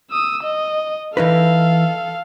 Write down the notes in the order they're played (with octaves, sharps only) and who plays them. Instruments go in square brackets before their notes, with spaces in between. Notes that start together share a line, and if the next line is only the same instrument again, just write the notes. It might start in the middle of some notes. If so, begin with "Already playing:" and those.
[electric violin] D#6 E6
D#5
[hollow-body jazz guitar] E3 D#4 B4 [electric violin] A4 F5